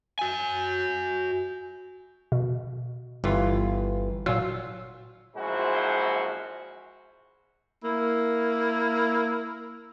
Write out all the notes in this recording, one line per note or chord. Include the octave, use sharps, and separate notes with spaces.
F#4 G#5
B2
G1 E3 F4
A#2 F#3 F4 E6
A#1 F#2 G#3 E4 F#4 C5
A#3 E4